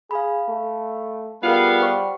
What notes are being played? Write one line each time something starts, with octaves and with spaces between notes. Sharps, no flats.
G#4 F5 B5
A3
G3 B3 F4 G#4 A#4 F5
C5 F#5 C#6